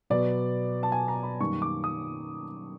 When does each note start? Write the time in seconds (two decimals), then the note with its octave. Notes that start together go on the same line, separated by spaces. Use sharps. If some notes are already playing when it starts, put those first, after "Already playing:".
0.10 B2 F#3 B3 D5
0.83 A5
0.92 G#5
1.08 A#5
1.23 B5
1.40 F#2 D#3 G3 A#3 C#6
1.62 D6
1.84 D#6